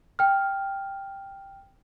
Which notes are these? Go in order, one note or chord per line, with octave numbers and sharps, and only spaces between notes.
G5 F6